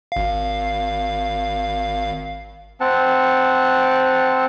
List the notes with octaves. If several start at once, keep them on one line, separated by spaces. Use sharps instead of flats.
G#1 F5
C4 F#5 A5